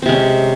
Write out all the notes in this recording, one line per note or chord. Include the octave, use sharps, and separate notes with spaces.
C3 G#3 C4 C#4